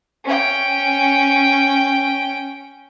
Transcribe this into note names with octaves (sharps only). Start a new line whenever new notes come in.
C#4 G5